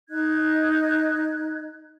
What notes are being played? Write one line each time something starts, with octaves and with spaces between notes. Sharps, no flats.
D#4 D#5 F#6 G#6